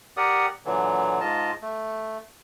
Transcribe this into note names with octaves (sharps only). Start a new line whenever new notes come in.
G4 A#4 D5 F#5 D#6
A#2 D3 E3 F#3
G#2 F4 D#5 A5
A3